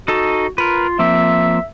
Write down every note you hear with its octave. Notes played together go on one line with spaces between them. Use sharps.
D#4 F#4 A4 A5
F4 A#4 B4
F3 A#3 C4 E5